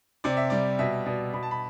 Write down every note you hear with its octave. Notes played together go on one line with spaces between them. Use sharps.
C3 D5
E5
G3 D5
B2 E5
B2 D5
B2 B5
A5
B5